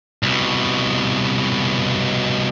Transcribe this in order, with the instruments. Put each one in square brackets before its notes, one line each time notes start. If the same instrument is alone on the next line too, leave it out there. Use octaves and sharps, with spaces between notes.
[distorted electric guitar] C2 B2